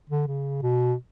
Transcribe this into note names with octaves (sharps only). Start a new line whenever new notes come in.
D3
C#3
B2